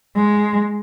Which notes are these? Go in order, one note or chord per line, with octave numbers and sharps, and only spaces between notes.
G#3